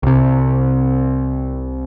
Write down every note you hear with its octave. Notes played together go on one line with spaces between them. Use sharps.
C2 C3